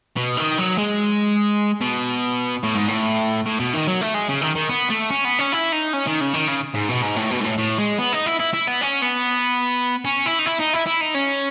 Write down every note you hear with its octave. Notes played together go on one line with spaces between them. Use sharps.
B2
D#3
F#3
G#3
B2
A2
G#2
A2
A2
B2
D#3
F#3
A3
G#3
C#3
D#3
D#3
B3
A3
C#4
B3
C#4
E4
D#4
C#4
D#3
C#3
D#3
C#3
G#2
B2
G#2
A2
B2
G#2
A2
A2
G#3
B3
D#4
E4
E4
E4
B3
C#4
B3
C#4
E4
D#4
E4
D#4
E4
E4
D#4
C#4